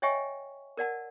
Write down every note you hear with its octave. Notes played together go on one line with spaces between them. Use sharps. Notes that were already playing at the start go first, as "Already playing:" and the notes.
C#5 D#5 E5 G5 G#5 C#6
A#4 D5 F#5 A5